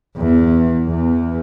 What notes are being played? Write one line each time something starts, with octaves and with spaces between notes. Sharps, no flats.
E2
E2